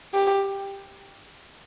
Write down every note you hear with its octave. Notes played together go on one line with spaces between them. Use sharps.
G4